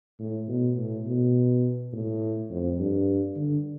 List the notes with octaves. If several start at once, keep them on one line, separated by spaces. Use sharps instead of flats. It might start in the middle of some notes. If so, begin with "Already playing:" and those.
A2
B2
A2
B2
A2
F2
G2
D3